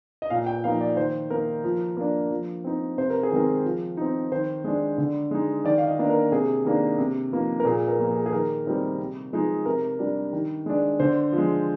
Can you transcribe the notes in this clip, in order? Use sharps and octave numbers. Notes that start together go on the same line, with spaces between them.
D#5
A#2 F5
G5
F3 A#3 D#4 F5
D5
D#3 C5
A#3 D#4 A#4
F3
A#3 D4
F3
C4 D#4
C3 C5
A#4
G#4
D#3 G#3 C4 A#4
F3
C4 D#4
D#3 C5
G#3 D4
D3
G#3 D#4
D#3 D5
F5
D#5
A#3 D4
A#4
C3 G#4
D#3 A#3 D4
C3
F3 A#3 D#4
A#4
A#2 G#4
A#4
F3 A#3
G#4
G#4
D#3 A#4
G3 C4 D#4
C3
F3 G#3 D#4
C3 A#4
G3 D4
D#3
G#3 D4
D3 C5
F3
G#3